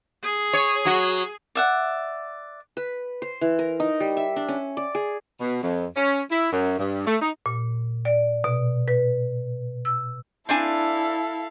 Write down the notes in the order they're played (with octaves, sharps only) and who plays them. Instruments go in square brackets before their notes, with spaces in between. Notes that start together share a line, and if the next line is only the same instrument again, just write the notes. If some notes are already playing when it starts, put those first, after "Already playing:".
[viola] G#4
[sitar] C#5
F#3 F#4
[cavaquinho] D5 E5 F#5
[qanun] B4
C5
E3
A#4
D#4
G3
E5
D4
C#4
D5
G#4
[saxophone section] B2
F2
C#4
E4
F#2
G2
A3
D#4
[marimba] A#2
D5
B2
B4
E6
[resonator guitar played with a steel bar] C4 D4 G#5 [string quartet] E4 A4 F5